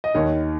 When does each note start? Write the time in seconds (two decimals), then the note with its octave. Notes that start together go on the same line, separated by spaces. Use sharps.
0.04 D#5
0.15 D#2 D#3 C#5